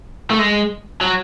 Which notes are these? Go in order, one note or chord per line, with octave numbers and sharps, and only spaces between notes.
A3
G#3
F#3